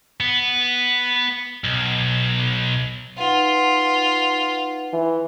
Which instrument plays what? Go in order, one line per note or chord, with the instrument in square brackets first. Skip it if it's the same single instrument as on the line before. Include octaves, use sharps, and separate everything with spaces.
[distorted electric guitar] B3
B1
[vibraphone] D#4 B4 F#5 [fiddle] F4
[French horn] E3